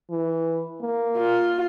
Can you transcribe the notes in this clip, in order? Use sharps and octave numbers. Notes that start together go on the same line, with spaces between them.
E3
A#3
F4